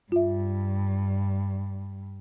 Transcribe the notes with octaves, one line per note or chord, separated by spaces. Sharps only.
G2 F4 E5